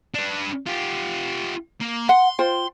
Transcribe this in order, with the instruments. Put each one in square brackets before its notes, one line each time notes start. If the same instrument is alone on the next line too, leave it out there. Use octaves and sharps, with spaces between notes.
[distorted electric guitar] D4 B4
F4 G4
A#3
[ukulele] F#5 [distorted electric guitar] C6
[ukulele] F4 C5 G5